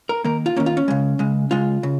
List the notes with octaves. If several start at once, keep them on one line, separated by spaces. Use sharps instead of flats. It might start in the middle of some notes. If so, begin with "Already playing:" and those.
A#4
D#3 A#3 A#4
F4
D#3 A#3 C#4
F4
C#4
C#3 G#3
C#3 G#3
C#3 G#3 F4
C#3